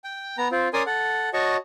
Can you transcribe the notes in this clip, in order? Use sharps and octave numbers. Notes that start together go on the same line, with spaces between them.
G5
B3 A#5
C4 F4
C#4 A#4 D5 G#5 C6 D#6
A4 F#5
F#4 C#5 D#5 A5 C#6